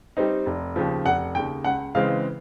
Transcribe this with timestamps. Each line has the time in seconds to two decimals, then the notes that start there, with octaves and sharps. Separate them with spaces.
0.17 G3 C4 D#4
0.46 F1
0.76 D#2 C#3 F3
1.05 F1 F#5
1.35 D#2 C#3 G5
1.64 C#2 F#5
1.95 C#3 E3 G#3 C4 F5